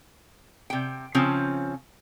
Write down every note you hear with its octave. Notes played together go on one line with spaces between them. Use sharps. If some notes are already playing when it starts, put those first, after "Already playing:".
C3 G5
C#3 F3 C4 C#4